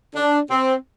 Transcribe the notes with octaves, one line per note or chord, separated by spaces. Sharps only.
D4
C4